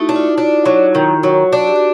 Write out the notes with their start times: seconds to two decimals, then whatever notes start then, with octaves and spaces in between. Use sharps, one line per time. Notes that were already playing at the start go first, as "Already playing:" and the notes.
Already playing: A3 D#4 E4 F#4
0.09 D4
0.16 F4
0.38 D4
0.66 F#3
0.95 D#3
1.23 F#3 F#4
1.53 D4
1.67 G4
1.76 F#4